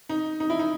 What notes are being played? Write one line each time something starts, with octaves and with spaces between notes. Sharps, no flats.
D#4
D#4
E4
D#4